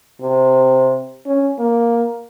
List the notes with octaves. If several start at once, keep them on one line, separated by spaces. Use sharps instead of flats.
C3
C#4
A#3